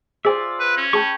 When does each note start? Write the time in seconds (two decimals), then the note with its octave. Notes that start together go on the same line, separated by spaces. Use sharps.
0.25 F4 G#4 C5 D5 E5 G#5
0.60 B4
0.77 C#4
0.93 G#4 G5 A5 B5 C#6